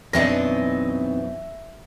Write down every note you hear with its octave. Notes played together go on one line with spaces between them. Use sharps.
F#2 B2 E3 C4 D4 D#4 E5 A#6